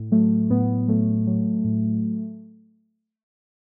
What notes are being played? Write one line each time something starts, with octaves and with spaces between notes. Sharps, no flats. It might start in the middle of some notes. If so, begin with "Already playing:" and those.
Already playing: A2
F#3 A3
A2 B3
F#3 A3
F#3
A2